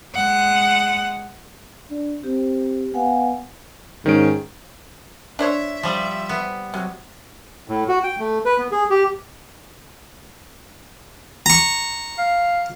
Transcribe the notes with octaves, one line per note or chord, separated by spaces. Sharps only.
G#3 F#5
D4
C4 G4
B3 F5 F#5 G#5
G#2 D#3 C#4 D7
D4 C5 C#5 E5
F3 G3
B3
C3 F#3
A2
F#4
G5
A3
B4
B3
G#4
G4
A#5 C#6
F5